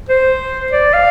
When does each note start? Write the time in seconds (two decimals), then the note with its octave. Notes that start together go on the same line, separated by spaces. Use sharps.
0.09 C5
0.72 D5
0.94 F5